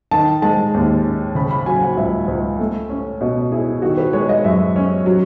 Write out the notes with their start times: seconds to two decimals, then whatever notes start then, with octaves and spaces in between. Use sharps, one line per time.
0.11 D#3 A5
0.42 G#3 A5
0.74 D#2
1.04 C#4
1.35 C#3 B5
1.51 B5
1.66 F#3 G#5
1.76 G#5
1.82 F#5
1.97 C#2 E5
2.28 C#2
2.59 A3
2.90 C#4
3.21 B2 D#5
3.52 E4 G#4
3.82 D#3 F#4
3.98 B4
4.13 G#3 C#5
4.29 D#5
4.44 F#2 E5
4.76 C#4
5.06 F#3